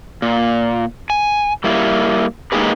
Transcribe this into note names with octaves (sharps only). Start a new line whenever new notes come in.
A#2
G#5
G3 A#3 E4
G#3 A#3 D#4 G4 G#4 B4